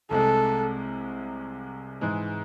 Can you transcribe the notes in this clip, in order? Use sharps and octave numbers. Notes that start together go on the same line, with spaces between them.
C2 C3 G#3 A4
G#2 E3 G#3